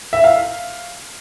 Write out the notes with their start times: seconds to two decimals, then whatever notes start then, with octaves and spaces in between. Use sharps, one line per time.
0.13 E5
0.24 F5